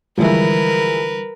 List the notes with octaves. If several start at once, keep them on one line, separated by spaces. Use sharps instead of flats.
D3 E3 F3 G3 G#3 E4 A#4 B4